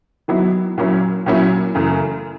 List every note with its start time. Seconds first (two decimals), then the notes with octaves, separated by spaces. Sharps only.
0.28 D#3 F#3 B3 E4
0.78 A#2 F#3 A#3 C#4 E4
1.26 A#2 F#3 A#3 C#4 E4
1.75 F#2 C#3 E3 A3